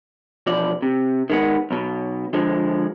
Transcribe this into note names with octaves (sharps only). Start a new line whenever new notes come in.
E2 B2 F3 D5
C3
D#3 G#3 B3
B1 B2
D3 F3 G#3